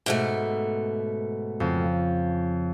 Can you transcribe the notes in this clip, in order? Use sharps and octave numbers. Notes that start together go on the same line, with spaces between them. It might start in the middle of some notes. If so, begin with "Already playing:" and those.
G#2 B2 A3
F2 C#3